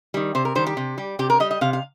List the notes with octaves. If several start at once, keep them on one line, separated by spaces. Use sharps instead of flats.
D#3 G3
C3 C5
A#4
D#3 G3 C5
G4
C3
G3
C3 G4
A#4
G3 D#5
D#5
C3 F5
F5